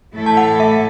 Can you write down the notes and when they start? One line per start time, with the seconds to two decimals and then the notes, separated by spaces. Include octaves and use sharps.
0.16 A2 E3 A3 E4 A4
0.26 A5
0.37 F#5
0.60 E5